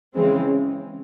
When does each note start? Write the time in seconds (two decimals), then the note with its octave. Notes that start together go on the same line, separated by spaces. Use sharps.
0.15 C#3 E3 G#3 C4